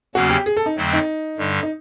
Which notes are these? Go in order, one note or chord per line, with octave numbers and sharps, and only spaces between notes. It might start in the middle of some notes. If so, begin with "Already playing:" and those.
E2 C#3 F#3 A#3 C#4 F#4
G4
G#4
A4
D#4
F2 D3 F#3 A3 C4
D#4
G2 D3 G3
D#4